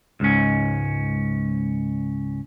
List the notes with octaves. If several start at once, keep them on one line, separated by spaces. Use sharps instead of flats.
C#2 G#2 C#4